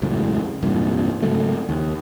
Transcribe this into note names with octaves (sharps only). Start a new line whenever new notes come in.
E1 C#2 F#2 A2
E1 C2 G2 A#2
G#2 C#3 F#3 A3
D#2